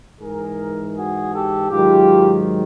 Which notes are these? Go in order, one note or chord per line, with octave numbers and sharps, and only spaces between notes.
G#2 E3 G#4 A#4
F#4 G#4
G4 A4
G#2 D#3 F#3 F4 G4